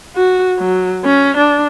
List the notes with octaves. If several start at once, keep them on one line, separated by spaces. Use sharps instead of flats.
F#4
F#3
C#4
D4